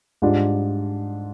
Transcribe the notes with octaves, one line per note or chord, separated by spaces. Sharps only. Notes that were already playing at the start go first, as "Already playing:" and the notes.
G#2 G3 D4 F4